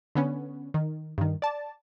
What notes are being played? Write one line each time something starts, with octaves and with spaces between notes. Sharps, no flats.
D3 B3 C#4
D#3
G2 D#3
D5 A5